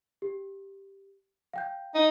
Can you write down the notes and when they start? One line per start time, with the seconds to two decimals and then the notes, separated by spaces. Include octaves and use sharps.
0.22 G4
1.53 F5 G5 G6
1.95 D#4